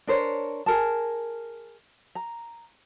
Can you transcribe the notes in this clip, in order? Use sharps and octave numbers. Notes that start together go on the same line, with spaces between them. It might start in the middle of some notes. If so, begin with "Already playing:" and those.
D4 A#4 C5 C#5
G#4 A#4 A5
A#5